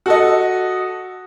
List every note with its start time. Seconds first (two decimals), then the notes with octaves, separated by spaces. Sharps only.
0.06 F#4 A4 D#5